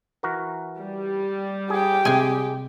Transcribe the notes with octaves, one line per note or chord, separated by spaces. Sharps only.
E3 F#4 A#4
G3
G4 G#4 G5
C3 G#3 G#4 G#5